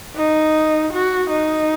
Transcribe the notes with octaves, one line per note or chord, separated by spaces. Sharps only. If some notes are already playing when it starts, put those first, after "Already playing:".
D#4
F#4
D#4